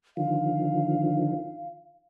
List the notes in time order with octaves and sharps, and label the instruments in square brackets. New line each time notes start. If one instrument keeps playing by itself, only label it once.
[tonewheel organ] D3 D#3 F3 [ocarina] F5